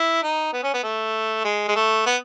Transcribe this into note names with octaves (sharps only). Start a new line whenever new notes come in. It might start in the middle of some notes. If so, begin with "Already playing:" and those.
Already playing: E4
D#4
B3
C#4
B3
A3
G#3
G#3
A3
B3